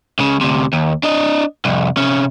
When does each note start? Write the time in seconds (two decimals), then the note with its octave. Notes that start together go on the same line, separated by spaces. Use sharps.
0.19 C#2 C#3
0.41 D2 C3
0.73 D#2
1.03 D4 D#5
1.65 C2 F2
1.97 C3 C#4